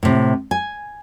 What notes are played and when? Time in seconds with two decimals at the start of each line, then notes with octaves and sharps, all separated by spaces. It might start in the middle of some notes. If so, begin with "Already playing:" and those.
0.03 A2 C3
0.51 G#5